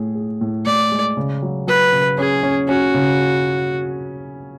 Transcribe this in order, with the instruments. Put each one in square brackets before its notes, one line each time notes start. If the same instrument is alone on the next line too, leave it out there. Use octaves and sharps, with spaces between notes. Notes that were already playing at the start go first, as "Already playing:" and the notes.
Already playing: [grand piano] A2 G#4
G#4
A2
[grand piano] A2 [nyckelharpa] D5
[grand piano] G#3
C#3
F#3
[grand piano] F#3 [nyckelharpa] B4
[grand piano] C#3
[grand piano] C#4 [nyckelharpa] G#4
[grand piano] C#4
[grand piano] C#4 [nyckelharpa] F#4
[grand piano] C#3